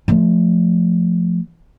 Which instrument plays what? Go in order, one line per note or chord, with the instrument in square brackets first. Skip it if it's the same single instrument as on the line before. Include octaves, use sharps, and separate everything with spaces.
[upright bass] F3 A3